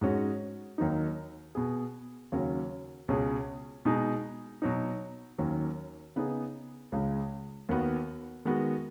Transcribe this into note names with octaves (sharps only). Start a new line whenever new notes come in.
G#2 G#3 C#4 F#4
D#2 D#3 F#3 D#4
B2 B3 G#4
D#2 C#3 F#3 C#4 F#4
C#2 B2 G#3 C#4 G#4
B2 G#3 D#4 G#4
B2 F#3 D#4
D#2 D#3 F#3 C#4
C#3 B3 D#4 G#4
C#2 C#3 G#3
D#2 D#3 B3 F#4
D#3 G#3 B3 F#4